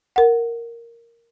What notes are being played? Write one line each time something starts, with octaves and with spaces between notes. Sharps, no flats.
A#4 F#5